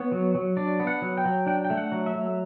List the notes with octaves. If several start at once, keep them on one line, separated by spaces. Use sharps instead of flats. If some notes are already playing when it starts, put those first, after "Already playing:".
Already playing: B3 C#5
F#3
F#3
D4 D5
B3
F#5
F#3
G5
F#3
D4 G5
G5
A3
F#5
F#3
E5
F#3